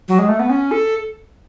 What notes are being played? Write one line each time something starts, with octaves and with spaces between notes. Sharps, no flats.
F#3
G#3
A3
B3
C#4
A4